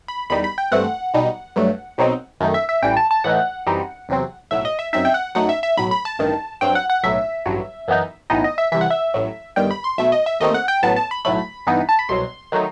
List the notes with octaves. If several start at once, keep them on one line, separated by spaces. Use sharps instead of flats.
B5
E2 D#3 G3 D#4 B5
B5
G5
G2 E3 A3 C4 F#5
B1 B2 G3 D#4
G2 F#3 A3
B1 B2 F#3 C4 D#4
F#2 D#3 A3 D#4
E5
E5
A1 A2 E3 G3 G5
A5
A5
A2 E3 A3 D#4 F#5
F#2 E3 G3 C4 D#4
E2 C3 F#3 C4
B1 A2 F#3 E5
D#5
E5
F#2 F#3 C4 D#4 E5
G5
F#5
F#2 F#3 A3 D#4 F#5
E5
E5
B1 A2 F#3 B5
B5
A5
A1 G2 D#3
G2 F#3 C4 G5
F#5
F#5
B1 A2 F#3 E5
A1 G2 F#3
F#2 E3 B3 D#4
B1 A2 E3 B3 D#4 D#5
D#5
E5
C2 C3 E3 E5
F#5
E5
A1 A2 F#3
G1 G2 D#3 G3 G5
B5
C6
B1 B2 A3 E5
D#5
E5
D#2 D#3 A3 C4 D#4 D#5
F#5
G5
A1 A2 F#3 B3 A5
A5
B5
B1 A2 F#3 A3 B5
G2 E3 B3 D#4
A5
B5
C2 B2 F#3 C6
D#3 F#3 A3 D#4